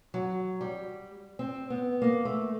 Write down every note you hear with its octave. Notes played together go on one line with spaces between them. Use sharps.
F#3
G3
C4
B3
A#3
A3